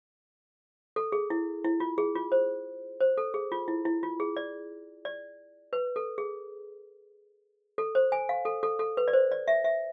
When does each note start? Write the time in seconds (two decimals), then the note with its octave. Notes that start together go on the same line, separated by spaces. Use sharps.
0.96 A4
1.12 G#4
1.30 E4
1.64 E4
1.80 F4
1.98 G#4
2.15 F4
2.32 C5
3.01 C5
3.17 A4
3.34 G#4
3.52 F4
3.68 E4
3.85 E4
4.03 F4
4.20 G#4
4.37 D5
5.05 D5
5.73 B4
5.96 A4
6.18 G#4
7.78 A4
7.95 C5
8.12 G#5
8.29 F5
8.45 A4
8.63 A4
8.79 A4
8.97 B4
9.08 D5
9.13 C5
9.31 D5
9.48 E5
9.64 E5